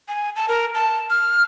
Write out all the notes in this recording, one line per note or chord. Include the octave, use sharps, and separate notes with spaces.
G#5
A5
A#4
A5
F6